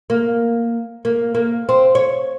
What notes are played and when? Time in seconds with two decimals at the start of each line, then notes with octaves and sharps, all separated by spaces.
0.10 A#3
1.05 A#3
1.35 A#3
1.69 C4
1.95 C#5